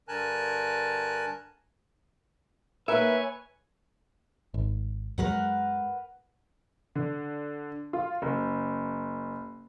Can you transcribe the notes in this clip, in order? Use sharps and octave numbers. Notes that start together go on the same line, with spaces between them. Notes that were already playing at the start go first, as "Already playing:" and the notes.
G2 D3 A#4 G#5 A5 F#6
A#3 D#4 A#4 B4 C#5 E5 G#5
G#1
F#2 F#3 G#3 A#4 B4 F#5
D3
F4
F#1